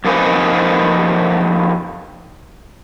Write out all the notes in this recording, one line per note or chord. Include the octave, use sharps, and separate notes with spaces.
F2 A#3 D#4 B4 C5 G#5